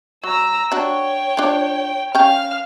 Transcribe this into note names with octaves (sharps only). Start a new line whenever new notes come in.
F#3 A#5 E6
D4 F#4 C#5 G5
F3 D4
C#4 F5 G5 F6